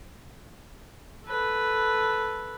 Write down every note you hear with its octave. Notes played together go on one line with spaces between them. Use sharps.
A4 B4